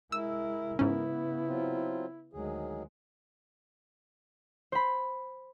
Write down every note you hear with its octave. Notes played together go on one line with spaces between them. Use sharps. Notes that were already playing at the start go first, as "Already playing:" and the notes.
G#3 E4 A#4 E6
G#2 C#3 B3 C#4 E4
F#3 C4 F4
D2 D#3 F#3 G#3 G#4
C5 B5